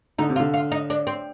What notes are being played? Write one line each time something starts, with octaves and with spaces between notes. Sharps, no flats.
D3 D#4
C3
F4
D3
F4
D#4
D4
C4